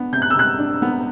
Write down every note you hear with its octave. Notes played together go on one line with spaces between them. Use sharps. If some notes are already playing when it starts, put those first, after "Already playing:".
Already playing: B3 D4
C3 G6
F#6
E6
C3 F#6
D4
B3